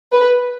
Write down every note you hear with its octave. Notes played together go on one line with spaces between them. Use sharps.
B4